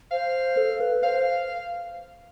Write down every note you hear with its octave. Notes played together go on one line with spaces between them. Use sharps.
C5 F5
A4
B4
C5 F5